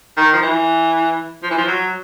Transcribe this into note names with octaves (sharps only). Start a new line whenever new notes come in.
D#3
F3
E3
F3
E3
F3
F#3